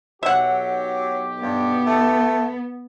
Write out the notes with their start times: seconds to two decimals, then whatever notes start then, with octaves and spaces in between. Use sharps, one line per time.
0.23 B1 F#3 G4 E5 F#5
1.42 G2 B3
1.87 A3